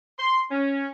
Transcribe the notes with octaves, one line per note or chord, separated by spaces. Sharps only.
C6
C#4